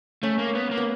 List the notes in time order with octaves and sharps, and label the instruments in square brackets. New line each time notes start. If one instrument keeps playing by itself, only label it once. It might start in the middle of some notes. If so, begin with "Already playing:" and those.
[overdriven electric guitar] A3 [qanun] C#4
[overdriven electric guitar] A#3
B3
A#3
[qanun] B3